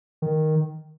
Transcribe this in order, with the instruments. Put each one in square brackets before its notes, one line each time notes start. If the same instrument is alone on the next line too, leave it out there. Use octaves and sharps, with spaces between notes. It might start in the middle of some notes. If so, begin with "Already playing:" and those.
[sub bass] D#3